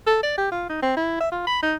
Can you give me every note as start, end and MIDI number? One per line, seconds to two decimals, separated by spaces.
0.07 0.18 69
0.23 0.34 74
0.38 0.47 67
0.52 0.69 65
0.70 0.81 63
0.83 0.96 60
0.97 1.20 64
1.21 1.31 76
1.32 1.44 65
1.47 1.59 83
1.63 1.76 63